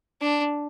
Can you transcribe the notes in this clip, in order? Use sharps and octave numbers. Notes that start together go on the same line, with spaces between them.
D4